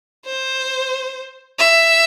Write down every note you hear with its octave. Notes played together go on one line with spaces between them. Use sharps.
C5
E5